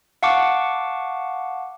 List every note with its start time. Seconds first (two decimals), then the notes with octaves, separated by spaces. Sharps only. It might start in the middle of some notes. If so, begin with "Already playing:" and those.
0.23 F5 F#5 A5 C#6 D6